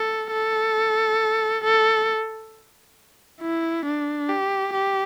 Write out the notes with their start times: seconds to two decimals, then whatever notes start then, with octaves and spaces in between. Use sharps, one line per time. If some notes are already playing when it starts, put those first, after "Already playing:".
Already playing: A4
0.31 A4
1.64 A4
3.41 E4
3.85 D4
4.29 G4
4.73 G4